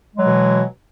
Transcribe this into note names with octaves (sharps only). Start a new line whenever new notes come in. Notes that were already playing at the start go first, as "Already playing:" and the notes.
B2 E3 F#3 G#3